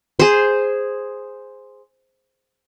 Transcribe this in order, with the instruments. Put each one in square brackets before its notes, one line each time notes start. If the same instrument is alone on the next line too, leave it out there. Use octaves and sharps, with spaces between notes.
[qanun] G#4 C5